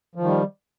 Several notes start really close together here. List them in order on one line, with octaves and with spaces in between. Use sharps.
F3 D#3 G3